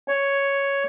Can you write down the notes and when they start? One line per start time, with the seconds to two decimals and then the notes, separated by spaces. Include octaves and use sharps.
0.08 C#5